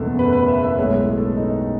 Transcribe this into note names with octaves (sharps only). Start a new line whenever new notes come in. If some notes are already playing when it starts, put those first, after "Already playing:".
Already playing: F#1 E2 B2 A3 A4
B4
B4
E5
E5
B1 A2 G#3 C#5
A4
D#4